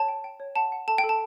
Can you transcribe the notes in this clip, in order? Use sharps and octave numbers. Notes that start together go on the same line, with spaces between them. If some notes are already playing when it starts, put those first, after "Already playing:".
Already playing: C#5 A5
G5
G5
C#5
F#5 A5
F#5
A4 A5
G5
A4
A5